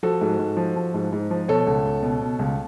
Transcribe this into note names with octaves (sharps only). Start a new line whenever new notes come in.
F3 F#4 A4
G#2
G#2
F3
F3
G#2
G#2
F3
B2 A4 C#5
C#2
C#2
B2
B2
C#2